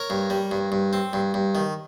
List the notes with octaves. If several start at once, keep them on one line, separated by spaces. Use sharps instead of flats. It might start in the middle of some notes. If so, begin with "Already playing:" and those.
Already playing: A#4 C#5
G2
G3
G2
G2
C4
G2
G2
D#3